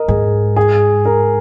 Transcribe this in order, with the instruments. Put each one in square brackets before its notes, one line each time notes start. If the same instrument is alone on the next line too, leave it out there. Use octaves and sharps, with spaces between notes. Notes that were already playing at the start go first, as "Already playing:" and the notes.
Already playing: [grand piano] A#4 D#5
[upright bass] G#2 [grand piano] G#4
[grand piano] G#4
A#4